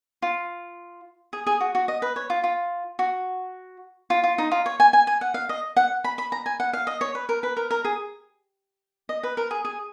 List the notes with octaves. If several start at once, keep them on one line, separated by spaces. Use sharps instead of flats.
F4
G#4
G#4
F#4
F#4
D#5
B4
C#5
F4
F4
F#4
F4
F4
D#4
F4
C#5
G#5
G#5
G#5
F#5
F5
D#5
F#5
B5
B5
A#5
G#5
F#5
F5
D#5
C#5
B4
A#4
B4
A#4
A#4
G#4
D#5
B4
A#4
G#4
G#4